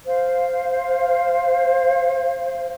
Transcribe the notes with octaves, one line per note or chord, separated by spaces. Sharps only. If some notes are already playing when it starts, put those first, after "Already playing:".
C5 F5